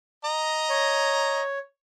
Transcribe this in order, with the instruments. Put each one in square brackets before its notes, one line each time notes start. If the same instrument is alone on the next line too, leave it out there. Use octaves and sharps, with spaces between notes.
[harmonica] D#5 A#5
[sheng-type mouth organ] C#5